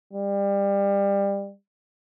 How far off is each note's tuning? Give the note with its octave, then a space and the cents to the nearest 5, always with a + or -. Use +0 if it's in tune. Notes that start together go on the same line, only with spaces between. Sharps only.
G3 +25